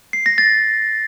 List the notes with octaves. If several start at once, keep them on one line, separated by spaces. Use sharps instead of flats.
C7
A#6
A6